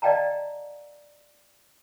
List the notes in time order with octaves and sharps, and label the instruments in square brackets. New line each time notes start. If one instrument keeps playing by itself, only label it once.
[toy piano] D5 D#5 F5 G5 A5 A#5